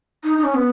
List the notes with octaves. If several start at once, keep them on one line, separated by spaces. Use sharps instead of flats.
D#4
D#4
C#4
B3